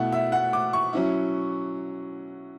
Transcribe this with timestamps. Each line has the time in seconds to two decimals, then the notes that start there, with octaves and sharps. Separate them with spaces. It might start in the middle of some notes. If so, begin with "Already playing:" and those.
Already playing: B2 A3 E4 F#5
0.12 E5
0.32 F#5
0.53 D6
0.73 C#6
0.93 F#3 C#4 E4